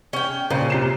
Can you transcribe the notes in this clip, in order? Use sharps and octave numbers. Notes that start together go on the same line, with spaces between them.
C#4 G5
A#2 C#3 C5
C3 C7 E7